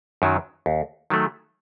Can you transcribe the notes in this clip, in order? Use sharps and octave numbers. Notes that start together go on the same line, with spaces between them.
F#2 D#3 F#3
D#2
D#3 F#3 A3